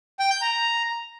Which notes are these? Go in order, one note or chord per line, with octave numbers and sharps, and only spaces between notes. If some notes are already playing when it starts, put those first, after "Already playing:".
G5
G6
A#5